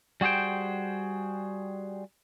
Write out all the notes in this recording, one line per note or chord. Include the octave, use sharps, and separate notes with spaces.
G3 F#4 G#4 C5 G5